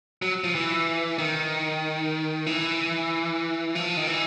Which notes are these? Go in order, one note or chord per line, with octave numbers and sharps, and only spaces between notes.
F#3
F3
E3
D#3
E3
F3
D#3
E3